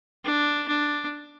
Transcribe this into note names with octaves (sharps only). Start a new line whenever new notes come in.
D4
D4